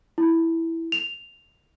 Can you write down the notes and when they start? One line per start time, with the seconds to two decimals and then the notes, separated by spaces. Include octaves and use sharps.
0.18 E4
0.92 F7